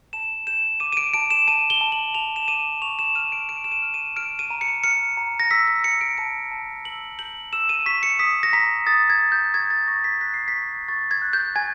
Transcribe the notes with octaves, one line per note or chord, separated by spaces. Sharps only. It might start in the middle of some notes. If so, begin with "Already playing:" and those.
A5 E7
G6 E7
D6 D#7
D#7
D7
A5 D7
E7
A5 D#7
G7
A5
F#7
A5 F7
E7
D6 D#7
C#6 F7
E7
F6 D#7
D7
F6 D7
E7
D#7
F6
D#7
F6 D7
D#7
A#5
C#7
F6 C#7
A#5
A#6
E6 B6
B6
E6 C#7
D7
A5 D7
A5
E6 F#7
G6 F#7
E6 E7
D#7
C#6 B6
C#7
D#6 B6
A#6
A#5 B6
D#6 A6
G#6
D#6
G6
C#6 G#6
A6
C#6 A#6
B6
F#6 B6
C7
B6
C#6
C#6 A6
G#6
F#6
G6
G#5 G#6